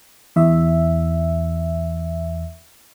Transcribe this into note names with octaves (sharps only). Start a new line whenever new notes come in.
E2 E5